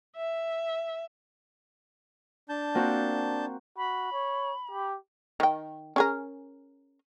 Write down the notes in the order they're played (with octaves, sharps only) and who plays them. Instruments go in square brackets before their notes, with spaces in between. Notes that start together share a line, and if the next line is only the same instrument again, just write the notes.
[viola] E5
[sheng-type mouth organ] D4 A5 G6
[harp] A#3 C4 F#4
[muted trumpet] F#4 [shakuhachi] B5
[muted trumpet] C#5
G4
[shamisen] D#3 G5
C#4 G#4 A#4